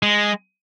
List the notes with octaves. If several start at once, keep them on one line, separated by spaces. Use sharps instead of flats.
G#3